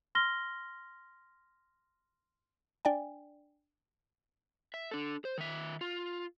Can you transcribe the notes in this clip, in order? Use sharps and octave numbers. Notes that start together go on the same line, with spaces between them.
C6 F6 A#6 G7
D4 D5 G5 G#5
E5
D4 A4
C5
D#3 E5
F4